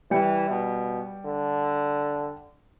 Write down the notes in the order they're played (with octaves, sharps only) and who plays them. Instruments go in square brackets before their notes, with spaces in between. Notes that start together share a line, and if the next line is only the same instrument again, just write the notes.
[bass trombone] E3 [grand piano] G3 G5 C#7
[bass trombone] B2
D3